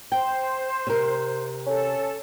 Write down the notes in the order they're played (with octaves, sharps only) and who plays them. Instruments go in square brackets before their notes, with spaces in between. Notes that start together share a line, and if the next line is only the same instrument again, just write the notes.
[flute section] C5 [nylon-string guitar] G5
[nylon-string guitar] C3 A#4
[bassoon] C#4 [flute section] A4